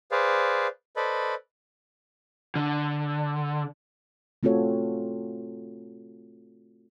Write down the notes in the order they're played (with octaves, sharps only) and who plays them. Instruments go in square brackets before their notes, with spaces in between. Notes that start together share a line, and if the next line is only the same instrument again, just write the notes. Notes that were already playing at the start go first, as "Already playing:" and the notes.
[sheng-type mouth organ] G#4 B4 C5 D5 F5
A4 B4 C5 D5 D#5 B5
[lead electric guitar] D3
[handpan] A3 C4 F4 F#4 A4 C#5